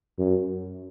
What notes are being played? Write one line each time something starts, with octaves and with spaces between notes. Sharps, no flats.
F#2